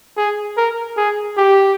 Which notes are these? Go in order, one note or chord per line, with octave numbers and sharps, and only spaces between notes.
G#4
A#4
G#4
G4